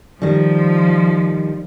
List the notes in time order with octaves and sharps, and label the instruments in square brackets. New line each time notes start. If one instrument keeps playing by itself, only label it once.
[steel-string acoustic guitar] D#3 G3 [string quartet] F3